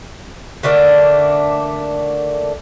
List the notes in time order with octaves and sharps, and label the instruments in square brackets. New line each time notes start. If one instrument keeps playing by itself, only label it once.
[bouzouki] D3 A3 A#3 D4